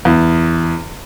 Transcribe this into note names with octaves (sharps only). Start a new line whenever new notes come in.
E2